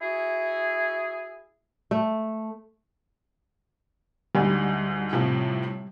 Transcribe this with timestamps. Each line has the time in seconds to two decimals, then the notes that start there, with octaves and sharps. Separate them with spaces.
0.01 E4 F#4 G#4
1.91 A3
4.35 D2 G#2 G3
5.13 A2 C3 F3